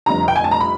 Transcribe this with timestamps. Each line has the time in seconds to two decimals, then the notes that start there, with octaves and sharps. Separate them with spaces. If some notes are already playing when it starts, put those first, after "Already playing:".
0.06 F1 F2 D3 G3 A#5
0.28 G5
0.36 G#5
0.44 A5
0.51 A#5
0.60 B5